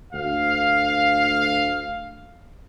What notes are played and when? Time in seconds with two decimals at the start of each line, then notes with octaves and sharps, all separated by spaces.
0.13 D2 F5